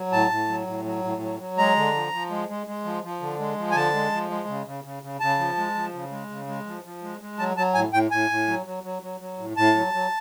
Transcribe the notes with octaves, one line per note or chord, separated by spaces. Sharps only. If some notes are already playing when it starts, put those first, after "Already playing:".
Already playing: F#3
A2 A5
A2
F#3
A2
F#3
A2
F#3
F#3
G#3 A#5
D3
F3
F3
G#3
G#3
G#3
F3
F3
D3
G#3
F3
G#5
D3 A5
G#3
F3
G#3
C#3
C#3
C#3
C#3
C#3 A5
F3
G#3
F3
C#3
G#3
C#3
G#3
F3
F3
G#3
G#3
F#3 A5
F#3 A5
A2 G#5
A2 G5
A2 G#5
A2
F#3
F#3
F#3
F#3
F#3
A2
A2 A5
F#3
F#3